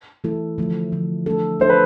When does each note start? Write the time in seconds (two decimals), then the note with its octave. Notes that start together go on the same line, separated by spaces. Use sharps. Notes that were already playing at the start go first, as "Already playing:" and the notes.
0.24 E3 A3 E4 A4
0.58 D3 F3 A3
0.92 D3 F3 A3
1.26 A3 D4 A4
1.60 A3 D4 A4 C5
1.70 B4